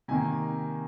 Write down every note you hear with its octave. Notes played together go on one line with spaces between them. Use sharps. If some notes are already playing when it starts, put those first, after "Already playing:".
C3 D#3 A#3 G#5